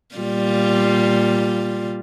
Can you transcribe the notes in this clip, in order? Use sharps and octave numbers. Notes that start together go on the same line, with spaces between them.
A#2 G3 F4